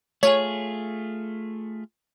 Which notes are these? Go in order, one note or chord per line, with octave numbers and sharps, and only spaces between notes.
A3 F4 G#4 C#5